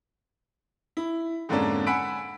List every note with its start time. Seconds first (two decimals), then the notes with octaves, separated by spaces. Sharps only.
0.97 E4
1.49 F2 G#2 D3 A#3 C#4 D4
1.86 F#5 G#5 B5 E6 B6 D7